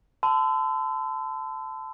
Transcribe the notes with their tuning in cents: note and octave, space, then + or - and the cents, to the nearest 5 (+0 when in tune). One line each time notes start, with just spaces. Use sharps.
A5 +0 C6 -45 E6 +10